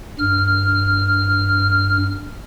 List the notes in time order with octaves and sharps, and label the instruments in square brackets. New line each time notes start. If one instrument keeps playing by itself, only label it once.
[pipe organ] G2 F6